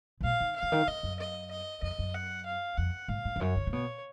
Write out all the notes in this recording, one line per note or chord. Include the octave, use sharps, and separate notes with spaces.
C#3
B2 F5
D#3
F5
C#3
D#3
C#3 D#5
F#2
D#5
D#5
F2 D#5
F#2
F#5
F5
F2 F#5
G#2 F5
G#2
F2
F#2 C#5
C#3
C#3
B2 C#5